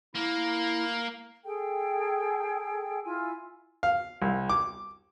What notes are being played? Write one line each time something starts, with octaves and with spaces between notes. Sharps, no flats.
A#3 E4
G#4 A4 G5
E4 F4 G#5 E6
F5
C2
D6